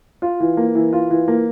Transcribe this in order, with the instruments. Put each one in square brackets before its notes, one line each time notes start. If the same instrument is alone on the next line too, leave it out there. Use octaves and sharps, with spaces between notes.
[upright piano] F4
E3
A#3
E3
F4
E3
A#3